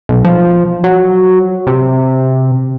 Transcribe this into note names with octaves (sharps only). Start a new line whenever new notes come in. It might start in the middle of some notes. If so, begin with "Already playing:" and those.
B1
F3
F#3
C3